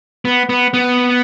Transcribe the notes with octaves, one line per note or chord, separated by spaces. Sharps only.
B3
B3
B3